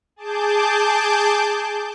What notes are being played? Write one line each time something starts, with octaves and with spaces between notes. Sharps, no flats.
G#4 A5 D6 G6